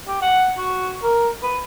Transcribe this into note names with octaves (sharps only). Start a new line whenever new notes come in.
G4
F#5
F#4
A#4
B4